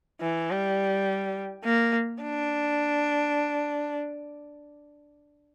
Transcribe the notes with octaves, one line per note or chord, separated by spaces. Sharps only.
E3
G3
A#3
D4